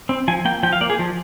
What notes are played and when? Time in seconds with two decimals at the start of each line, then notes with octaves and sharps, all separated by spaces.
0.09 C4
0.28 F3 G#5
0.45 A#3 G5
0.63 F3 G5
0.73 F5
0.81 A#3 D5
0.90 G#4
0.99 F3